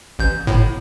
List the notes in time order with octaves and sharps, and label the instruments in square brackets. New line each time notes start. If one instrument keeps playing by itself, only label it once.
[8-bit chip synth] A1 G6
G1 A2